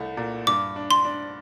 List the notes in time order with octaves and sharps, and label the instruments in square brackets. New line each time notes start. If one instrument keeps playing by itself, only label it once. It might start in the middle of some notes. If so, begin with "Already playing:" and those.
Already playing: [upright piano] C2 A3
A#2
[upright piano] G2 [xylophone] D6
[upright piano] D4
[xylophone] C6
[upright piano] D4